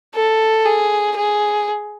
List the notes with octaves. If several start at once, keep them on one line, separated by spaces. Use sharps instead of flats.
A4
G#4
G#4